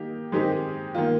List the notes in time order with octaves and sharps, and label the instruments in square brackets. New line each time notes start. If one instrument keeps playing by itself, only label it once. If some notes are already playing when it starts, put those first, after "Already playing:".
Already playing: [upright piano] D#3 A#3 D#4 G4
D#3 G#3 C4 D#4 G4
D#3 A#3 F4